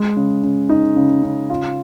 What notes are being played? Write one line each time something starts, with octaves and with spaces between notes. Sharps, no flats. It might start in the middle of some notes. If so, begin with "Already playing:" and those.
Already playing: G#3
C#3
C#3
D#4
C#3
C#3
F4